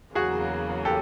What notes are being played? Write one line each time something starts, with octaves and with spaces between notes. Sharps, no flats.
E2 C#3 F#3 A#3 F#4 G#4
G4 A4